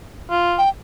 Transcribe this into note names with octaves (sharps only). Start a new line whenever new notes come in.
F4
G5